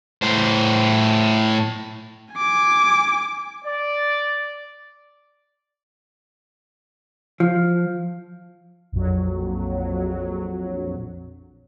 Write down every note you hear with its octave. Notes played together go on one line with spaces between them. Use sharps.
A2 C5
G#5 D6
D5
F3
A#1 F2 F#3